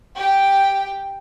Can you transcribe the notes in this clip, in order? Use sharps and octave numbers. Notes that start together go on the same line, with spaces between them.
G4 G5